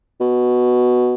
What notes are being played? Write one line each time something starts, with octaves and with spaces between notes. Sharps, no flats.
B2